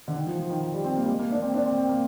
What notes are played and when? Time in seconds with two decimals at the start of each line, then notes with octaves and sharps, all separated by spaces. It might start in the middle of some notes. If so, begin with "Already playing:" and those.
0.08 D3
0.16 D#3
0.27 F3
0.39 F3
0.50 D#3
0.61 D#3
0.73 G3
0.84 C4
0.96 A#3
1.02 G3
1.08 G#3
1.19 A#3
1.31 D4
1.37 A#3
1.42 C4
1.54 D4
1.66 C4
1.77 C4
1.89 A#3